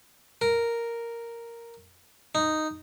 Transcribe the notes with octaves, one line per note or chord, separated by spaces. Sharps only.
A#4
D#4